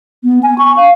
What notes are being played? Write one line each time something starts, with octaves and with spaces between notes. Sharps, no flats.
B3
G#5
C#6
F5